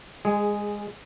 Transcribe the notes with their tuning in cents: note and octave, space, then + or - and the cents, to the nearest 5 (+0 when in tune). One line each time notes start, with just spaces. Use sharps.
G#3 -20 G#4 +0